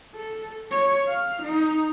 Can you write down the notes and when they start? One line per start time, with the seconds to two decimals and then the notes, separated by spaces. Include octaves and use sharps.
0.15 A4
0.71 C#5
1.07 F5
1.42 D#4